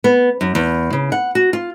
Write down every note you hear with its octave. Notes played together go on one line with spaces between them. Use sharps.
B3
F#2
E2
C#3
F#5
F#4
F4